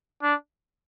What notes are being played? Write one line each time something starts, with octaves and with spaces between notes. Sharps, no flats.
D4